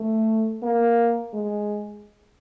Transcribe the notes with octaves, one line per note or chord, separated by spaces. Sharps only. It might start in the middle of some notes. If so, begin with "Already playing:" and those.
Already playing: A3
A#3
G#3